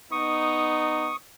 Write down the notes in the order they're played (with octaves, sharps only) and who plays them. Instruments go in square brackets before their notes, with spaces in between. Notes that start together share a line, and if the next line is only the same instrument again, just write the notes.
[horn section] B3 D#4 [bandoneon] C#6 D#6